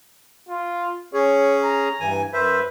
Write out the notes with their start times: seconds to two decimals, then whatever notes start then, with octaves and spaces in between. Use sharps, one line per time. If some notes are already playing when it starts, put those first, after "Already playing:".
0.49 F4
1.13 C#4 G#4 C#5
1.64 A#5
2.00 G2 E3 G#5
2.33 F#2 B4 C5 E5